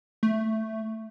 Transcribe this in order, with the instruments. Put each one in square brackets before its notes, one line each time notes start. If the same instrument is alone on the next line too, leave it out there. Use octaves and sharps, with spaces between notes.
[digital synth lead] A3